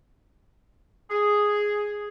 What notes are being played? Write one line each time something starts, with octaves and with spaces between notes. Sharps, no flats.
G#4